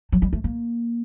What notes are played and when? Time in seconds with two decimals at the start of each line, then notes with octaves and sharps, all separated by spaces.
0.12 F#3
0.22 G3
0.33 A3
0.44 A#3